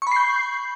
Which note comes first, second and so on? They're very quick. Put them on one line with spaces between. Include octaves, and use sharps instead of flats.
C#6 B5 C7 G6